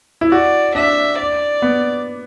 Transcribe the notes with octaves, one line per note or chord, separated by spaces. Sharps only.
E4
F#4 D5
D4 E5
D5
B3